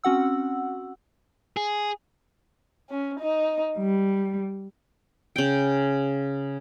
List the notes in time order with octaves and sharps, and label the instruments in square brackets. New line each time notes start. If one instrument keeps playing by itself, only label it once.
[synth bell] C4 C#4 F#4 F#5 E6
[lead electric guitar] G#4
[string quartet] C#4
D#4
G3
[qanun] C#3 G5